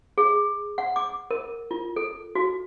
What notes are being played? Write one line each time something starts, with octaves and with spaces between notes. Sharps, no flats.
G#4
F#5
D6
A#4
F4
A4
F#4